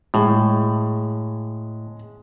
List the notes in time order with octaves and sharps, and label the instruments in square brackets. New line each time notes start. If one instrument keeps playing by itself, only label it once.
[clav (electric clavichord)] A2 [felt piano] G#3